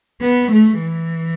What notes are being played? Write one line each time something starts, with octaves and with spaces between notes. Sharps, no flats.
B3
A3
E3